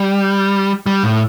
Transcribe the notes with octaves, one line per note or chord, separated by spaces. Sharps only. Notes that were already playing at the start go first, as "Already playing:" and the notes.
Already playing: G3
G3
A2